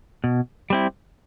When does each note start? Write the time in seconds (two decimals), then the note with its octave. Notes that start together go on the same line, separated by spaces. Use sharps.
0.24 B2
0.70 G3 C4 E4